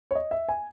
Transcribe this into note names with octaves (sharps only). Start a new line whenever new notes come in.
C#5
D#5
E5
G#5